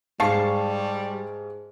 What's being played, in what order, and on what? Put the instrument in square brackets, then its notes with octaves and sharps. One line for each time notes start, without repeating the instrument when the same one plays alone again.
[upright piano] G#2 F5 [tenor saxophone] G3 [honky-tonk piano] A5 C#6 C7